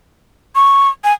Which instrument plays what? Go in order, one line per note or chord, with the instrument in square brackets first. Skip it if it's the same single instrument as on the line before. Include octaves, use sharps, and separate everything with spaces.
[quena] C#6
G#5